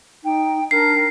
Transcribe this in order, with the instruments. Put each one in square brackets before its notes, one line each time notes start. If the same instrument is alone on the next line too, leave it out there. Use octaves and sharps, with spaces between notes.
[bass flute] D#4 [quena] G5
[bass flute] D4 [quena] A#4 [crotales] C7